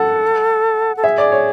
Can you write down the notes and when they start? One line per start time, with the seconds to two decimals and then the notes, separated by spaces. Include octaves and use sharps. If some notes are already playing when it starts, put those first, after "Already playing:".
Already playing: A4 F#5
0.97 A4
1.04 G#4 E5
1.18 D5
1.32 C#5